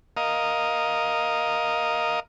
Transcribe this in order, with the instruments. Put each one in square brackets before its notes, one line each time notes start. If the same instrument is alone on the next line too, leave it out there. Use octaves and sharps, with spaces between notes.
[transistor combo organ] A#4 D#5 F5